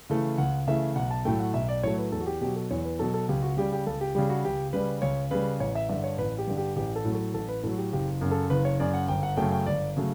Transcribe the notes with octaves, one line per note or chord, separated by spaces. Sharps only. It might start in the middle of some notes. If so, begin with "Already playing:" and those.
C#3 E3 A3
C#2 F#5
C#3 E3 A3 E5
B1 F#5
A5
A2 F#3 A3 G5
F#5
B1 E5
D5
A2 F#3 A3 C#5
B4
E2 A4
F#4
G4
B2 F#3 G4
A4
E2 C#5
B4
B2 F#3 A4
A4
C#2 G4
F#4
C#3 G3 G4
G4
C#2 A4
G4
C#3 G3 G4
F#4
C#2 G4
C#3 G3 B4
C#2 C#5
C#3 G3 B4
A1 C#5
E5
G2 D3 E5
C#5
A1 B4
G4
G2 D3
G4
A1 G4
A4
A2 F#3
A4
A1 A4
B4
A2 F#3 A4
G4
F#1 G4
F#2 C#3
A4
F#1 B4
C#5
F#2 C#3 D5
F#5
G1 G5
F#5
F#2 C#3 F#3 A3 G5
G5
G1 D5
C#3 F#3 A3